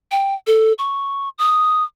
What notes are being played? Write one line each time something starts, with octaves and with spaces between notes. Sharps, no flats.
G5
A4
C#6
D#6